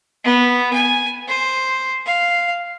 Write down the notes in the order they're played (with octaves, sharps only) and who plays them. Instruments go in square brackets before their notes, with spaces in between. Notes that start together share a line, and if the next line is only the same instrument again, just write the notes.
[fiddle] B3
G#5
C5
F5